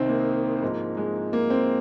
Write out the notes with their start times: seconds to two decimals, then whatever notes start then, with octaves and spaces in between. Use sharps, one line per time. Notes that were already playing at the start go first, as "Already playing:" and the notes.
Already playing: C2 C3 D#3 C4 D#4
0.09 A#3
0.62 G#2 F3
0.97 G#3
1.33 A#3
1.50 C4